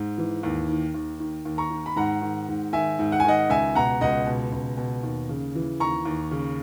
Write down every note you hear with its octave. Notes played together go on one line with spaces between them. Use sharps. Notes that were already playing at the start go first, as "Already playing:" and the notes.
Already playing: G#2
E3
D#2
D#3
D#2
D#3
D#2
A#5 C#6
D#3
B5
G#2 F#5 A#5
D#3
G#2
D#3 E5 G#5
G#2
F#5
G#5
D#3 D#5 F#5
C#2 E5 G#5
B2 F#5 A#5
C#2 D#5 F#5
B2
C#2
B2
D#2
C#3
E3
D#2 A#5 C#6
D#2
C#3